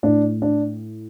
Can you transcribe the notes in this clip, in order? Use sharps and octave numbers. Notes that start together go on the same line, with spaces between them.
A2 D4
D4